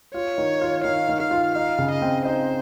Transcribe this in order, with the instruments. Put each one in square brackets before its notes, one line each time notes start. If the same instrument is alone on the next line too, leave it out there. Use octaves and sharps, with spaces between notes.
[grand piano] F4 [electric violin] C#5
[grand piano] D#3
F4
[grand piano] D#3 [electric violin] F5
[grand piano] D#3
[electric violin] F5
[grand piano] F4
[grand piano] D#4 [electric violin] F5
[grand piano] C#3
[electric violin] D#5
[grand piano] C4
[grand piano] D#4 [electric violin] C5